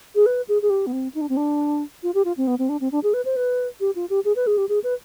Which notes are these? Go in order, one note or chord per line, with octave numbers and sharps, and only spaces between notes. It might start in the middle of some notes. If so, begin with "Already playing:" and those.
G#4
B4
G#4
G#4
G4
B3
C4
D#4
D4
C4
D4
F4
G4
F4
C4
B3
C4
D4
C4
D4
G#4
B4
C5
B4
G4
F4
G4
G#4
B4
G#4
G4
G#4
B4